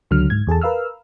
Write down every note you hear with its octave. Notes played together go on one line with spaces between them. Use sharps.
C#2 D3 F#3 F6
G#2 G#6
E2 G#4 A4 A5
A#4 B4 F5 E6 F6